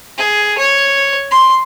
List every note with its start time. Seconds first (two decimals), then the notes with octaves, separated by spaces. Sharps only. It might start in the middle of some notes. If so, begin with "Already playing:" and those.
0.17 G#4
0.57 C#5
1.31 C6